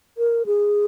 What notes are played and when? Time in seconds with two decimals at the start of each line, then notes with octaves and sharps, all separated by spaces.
0.18 A#4
0.46 G#4